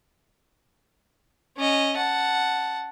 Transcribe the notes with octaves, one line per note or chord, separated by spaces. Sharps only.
C#4 D#5
F#5 A5